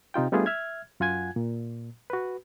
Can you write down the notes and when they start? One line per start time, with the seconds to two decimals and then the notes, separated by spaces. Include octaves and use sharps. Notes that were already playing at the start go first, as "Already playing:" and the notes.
0.14 C3 D#4 F4 G5
0.32 G3 A3 B3 D4 F4 G#4
0.46 E5 F6 G#6
1.00 F#2 F4 F#5 G#5 G#6
1.36 A#2
2.10 F#4 B4